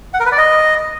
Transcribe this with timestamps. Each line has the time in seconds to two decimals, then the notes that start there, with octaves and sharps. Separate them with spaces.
0.14 F#5
0.20 A#4
0.26 B4
0.32 D5
0.38 D#5